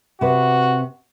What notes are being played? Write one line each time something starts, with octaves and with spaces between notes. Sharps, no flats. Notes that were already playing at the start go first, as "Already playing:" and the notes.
C3 F#4 B4